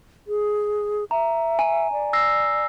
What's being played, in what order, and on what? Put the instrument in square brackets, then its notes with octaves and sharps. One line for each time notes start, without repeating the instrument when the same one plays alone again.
[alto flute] G#4
[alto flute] E5 [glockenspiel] A#5
[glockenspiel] G#5
[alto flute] D5
[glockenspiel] E6 A#6 C7